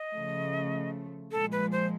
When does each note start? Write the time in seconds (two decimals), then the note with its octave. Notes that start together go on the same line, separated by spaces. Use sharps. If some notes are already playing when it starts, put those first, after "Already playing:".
Already playing: D#5
0.12 C#3 F3 A3
1.31 A#2 F3 G#3 A4
1.52 B4
1.72 C5